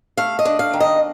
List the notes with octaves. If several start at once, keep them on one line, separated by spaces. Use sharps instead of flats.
A3 F5
D#5
D4
F5
D#3
D#5